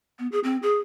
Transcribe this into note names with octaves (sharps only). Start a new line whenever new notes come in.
B3
G#4
C4
G#4